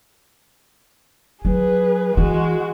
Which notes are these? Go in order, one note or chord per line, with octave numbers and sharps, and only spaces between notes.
F#3 G#4 B4
E3 G#3 F#4